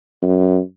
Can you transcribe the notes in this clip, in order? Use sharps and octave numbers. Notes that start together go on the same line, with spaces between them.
F#2